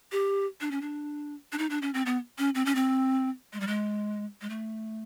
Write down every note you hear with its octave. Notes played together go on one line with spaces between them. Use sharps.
G4
D4
C#4
D4
D4
D#4
D4
C#4
C4
B3
C#4
C4
C#4
C4
G#3
G3
G#3
G#3
A3